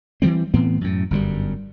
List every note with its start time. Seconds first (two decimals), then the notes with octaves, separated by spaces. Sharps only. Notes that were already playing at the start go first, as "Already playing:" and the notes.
0.22 E3 F#3 G3 C4
0.54 A2 E3 B3 C4
0.81 F#2 A2
1.11 G1 F#2 C3 G3